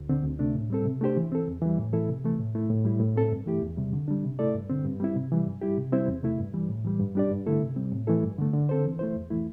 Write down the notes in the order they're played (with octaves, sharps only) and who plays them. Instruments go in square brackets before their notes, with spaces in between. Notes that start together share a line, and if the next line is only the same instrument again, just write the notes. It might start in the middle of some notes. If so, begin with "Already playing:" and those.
Already playing: [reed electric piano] D2
D3 C4
D2
C3 A3 D4
A2
G3 C4 A4
C3
A3 D4 G4 C5
E3
C4 A4
E2
E3 G3
A2
E3 A3 E4 A4
C3
E3 A3
A2
A3 E4
A2
G3 E4
A2
A3 C4 A4
G2
E3 A3 E4 G4
E2
C3 G3
D3
G3 D4
C3
A3 E4 A4 D5
G2
D3 C4
G2
G3 C4 E4
C3
E3 G3
G2
G3 E4 G4
C3
G3 C4 E4 C5
E2
C3 A3 E4
G2
E3 G3
A2
E3 G3
G2
G3 D4 G4 D5
G2
D3 A3 E4 A4
C3
G3 C4
A2
E3 A3 E4 A4
G2
D3 A3
D3
C4 A4 C5
E3
A3 E4 C5
E2
E3 A3 E4